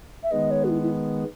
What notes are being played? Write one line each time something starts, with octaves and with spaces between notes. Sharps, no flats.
E5
D#3 G#3 B3 D#5
C#5
F#4
E4
E4